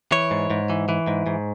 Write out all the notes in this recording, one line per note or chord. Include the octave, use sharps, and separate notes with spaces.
E3 C#5
G#2
G#2
E3
E3
G#2
G#2